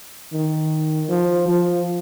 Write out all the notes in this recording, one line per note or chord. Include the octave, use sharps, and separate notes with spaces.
D#3
F3
F3